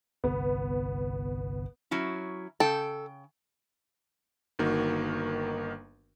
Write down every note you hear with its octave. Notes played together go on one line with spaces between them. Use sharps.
G1 C2 B3
F#3 C#4 E4
C#3 A4 G5
G1 D#3 A#3 F#4 A#4